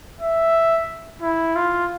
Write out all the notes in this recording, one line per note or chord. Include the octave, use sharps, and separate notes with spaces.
E5
E4
F4